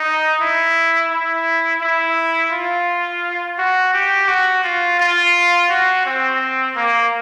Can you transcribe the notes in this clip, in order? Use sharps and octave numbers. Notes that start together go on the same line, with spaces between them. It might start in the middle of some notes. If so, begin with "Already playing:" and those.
Already playing: D#4
E4
E4
E4
F4
F#4
G4
F#4
F4
F4
F#4
C4
A#3